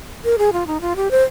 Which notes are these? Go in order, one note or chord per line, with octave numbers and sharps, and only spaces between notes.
A#4
G#4
F4
D#4
F4
G4
C5